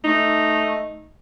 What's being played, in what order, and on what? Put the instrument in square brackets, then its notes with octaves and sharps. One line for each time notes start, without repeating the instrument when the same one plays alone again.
[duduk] A3 [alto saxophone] D#4